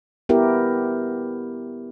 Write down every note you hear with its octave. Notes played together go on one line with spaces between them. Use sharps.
B3 E4 G4 A#4